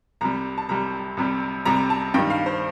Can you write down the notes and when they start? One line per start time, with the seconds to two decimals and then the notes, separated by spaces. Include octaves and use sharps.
0.21 C2 C3 G3 A#5
0.58 A5
0.69 C2 C3 G3 A#5
1.17 C2 C3 G3
1.65 C2 C3 G3 A#5
1.90 A5
2.14 G2 D#3 G3 G5
2.30 F5
2.46 C5